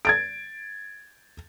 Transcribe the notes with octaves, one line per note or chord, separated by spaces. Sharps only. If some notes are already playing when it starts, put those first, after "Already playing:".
G#6 A6 D7